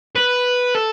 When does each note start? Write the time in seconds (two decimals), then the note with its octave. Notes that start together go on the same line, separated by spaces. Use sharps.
0.16 B4
0.75 A4